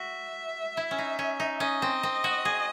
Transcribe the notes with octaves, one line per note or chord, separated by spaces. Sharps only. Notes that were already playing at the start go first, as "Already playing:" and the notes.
Already playing: F#4 E5
E4
C#4
D#4
C#4
D#4
C#4 D#5
C4
C4
F#4
G#4